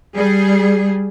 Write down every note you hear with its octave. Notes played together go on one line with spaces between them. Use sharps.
G3 G#4